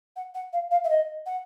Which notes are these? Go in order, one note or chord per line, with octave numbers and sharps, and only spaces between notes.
F#5
F#5
F5
F5
E5
D#5
F#5